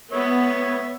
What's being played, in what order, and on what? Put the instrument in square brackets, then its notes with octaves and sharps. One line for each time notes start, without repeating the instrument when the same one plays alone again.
[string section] B3 [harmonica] C#5 E5